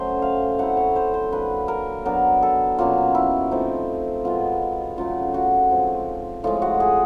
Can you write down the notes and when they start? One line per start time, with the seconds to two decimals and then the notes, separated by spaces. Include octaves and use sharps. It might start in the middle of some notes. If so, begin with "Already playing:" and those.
Already playing: F#3 A3 C#4 C5
0.22 F5
0.59 F#3 A3 C4 E4 F#5
0.77 C#5
0.96 C5
1.14 C5
1.32 F#3 A#3 D4 B4
1.68 A#4
2.05 F#3 B3 D4 A#4
2.42 A4
2.79 B2 F#3 A#3 C#4 F4
3.15 E4
3.51 F3 A3 C4 D#4
4.24 B2 G#3 B3 F4
4.98 C#3 F#3 A3 F4
5.34 F#4
5.71 F3 G#3 C4
6.44 A2 F3 G#3 F4
6.62 F#4
6.80 G#4